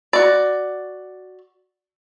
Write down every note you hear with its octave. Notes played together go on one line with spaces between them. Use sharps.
F#4 D5